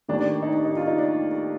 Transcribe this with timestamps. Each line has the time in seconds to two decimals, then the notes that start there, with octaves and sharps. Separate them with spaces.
0.08 D#2 D#3 A3 D4
0.20 D4
0.42 D#4
0.54 D4
0.65 D#4
0.77 F4
0.87 D#4
0.98 D4